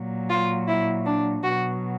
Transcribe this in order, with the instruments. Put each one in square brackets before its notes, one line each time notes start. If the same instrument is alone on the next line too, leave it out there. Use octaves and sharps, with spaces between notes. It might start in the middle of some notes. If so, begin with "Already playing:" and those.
Already playing: [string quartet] A#2 F#3
F4
E4
D4
B2 F#3 F#4